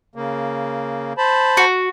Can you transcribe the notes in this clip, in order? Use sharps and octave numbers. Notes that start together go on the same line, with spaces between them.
C#3 A#3
C5 A5 B5
F#4